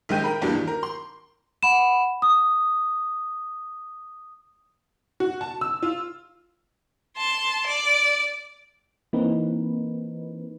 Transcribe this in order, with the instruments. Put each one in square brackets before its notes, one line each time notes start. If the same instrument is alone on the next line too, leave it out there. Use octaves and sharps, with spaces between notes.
[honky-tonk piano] A#1 D#3 G#3 G5 G6 D#7
A#4 G5 B5
E2 G2 F#3 G3 A#3 D4
D#3
A#4
C6
[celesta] F#5 B5 E7
D#6
[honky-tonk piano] F#4
A5
E6
F4
[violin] A5 C6
D5
[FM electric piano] E3 A#3 C4 D#4 B4